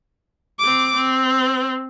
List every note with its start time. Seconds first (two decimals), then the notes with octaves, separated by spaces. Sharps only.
0.59 C4 D6
0.96 C4